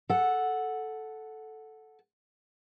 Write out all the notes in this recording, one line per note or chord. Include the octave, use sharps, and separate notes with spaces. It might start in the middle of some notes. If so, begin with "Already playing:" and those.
A4 F#5